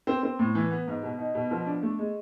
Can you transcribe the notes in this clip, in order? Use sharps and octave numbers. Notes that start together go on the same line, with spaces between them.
C4
C4
A2
E3
B3
G#2
B2
D#4
B2
F3
D4
A3
G#3